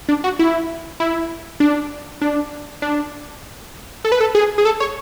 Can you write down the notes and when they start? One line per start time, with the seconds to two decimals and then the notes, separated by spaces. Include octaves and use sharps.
0.09 D4
0.24 F#4
0.39 E4
1.00 E4
1.60 D4
2.21 D4
2.82 D4
4.05 A4
4.12 B4
4.21 A4
4.35 G#4
4.58 G#4
4.65 A4
4.80 C#5